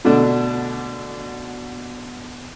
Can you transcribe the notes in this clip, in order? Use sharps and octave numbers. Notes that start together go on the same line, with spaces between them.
B2 D3 A3 D4